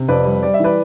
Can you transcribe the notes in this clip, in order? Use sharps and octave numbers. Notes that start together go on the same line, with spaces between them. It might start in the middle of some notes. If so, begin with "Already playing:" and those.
Already playing: C3
F2 B4 D5
G3
G3 D5
E5
E3 B4 D5